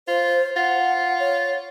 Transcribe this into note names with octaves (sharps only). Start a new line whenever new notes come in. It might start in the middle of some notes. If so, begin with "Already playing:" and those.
F4 C5
F4 F#5
C#5